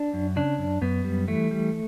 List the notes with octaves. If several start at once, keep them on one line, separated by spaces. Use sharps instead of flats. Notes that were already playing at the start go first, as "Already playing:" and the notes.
Already playing: D4
F#2
C#3 D4
F#2
F#2 B3
G3
E3 A3
G3